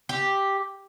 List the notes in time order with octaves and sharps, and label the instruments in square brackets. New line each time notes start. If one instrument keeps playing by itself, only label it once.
[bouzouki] G4